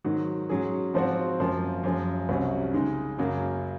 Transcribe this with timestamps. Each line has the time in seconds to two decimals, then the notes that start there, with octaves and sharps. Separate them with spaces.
0.04 G#2 D#3 F#3
0.49 G#2 F#3 C#4 G#4
0.94 G#2 F3 C4 F#4
1.39 F#2 F3 A#3
1.84 F#2 F3 G#3
2.29 C2 C3 F#3 C#4
2.73 C#3 G#3 D#4
3.18 F#2 C#3 F#3 A#3